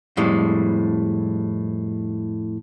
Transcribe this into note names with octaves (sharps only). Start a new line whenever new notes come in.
F2 A2 G3 G#3